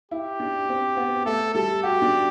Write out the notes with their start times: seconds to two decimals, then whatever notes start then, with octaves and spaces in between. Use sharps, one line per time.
0.11 E4 G4
0.40 D4
0.69 C4
0.97 B3
1.25 A3 A4
1.54 G3 A4
1.83 F#4 G4
2.02 D4